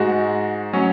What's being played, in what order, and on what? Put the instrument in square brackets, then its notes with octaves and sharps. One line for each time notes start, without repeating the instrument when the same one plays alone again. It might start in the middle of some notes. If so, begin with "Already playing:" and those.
Already playing: [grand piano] G#2 G#3 F#4
F#3 C#4